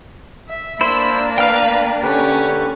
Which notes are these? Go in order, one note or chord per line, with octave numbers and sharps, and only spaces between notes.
E5
A#3 D4 E4 C5 B5 E6
B4 F5 G5 F6
D3 C#4 G4 B4